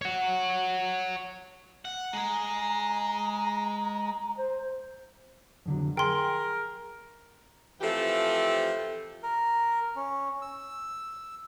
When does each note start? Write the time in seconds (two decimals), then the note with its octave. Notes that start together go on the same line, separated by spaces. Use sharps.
0.02 C#5 F#5
1.85 F#5
2.13 G#3 G#4 A#5
4.37 C5
5.66 F2 D3 F#3
5.97 G#4 A#4 G5 C6
7.81 E3 F3 A3 C4 G4 A4
9.23 A#4
9.96 C#4
10.42 E6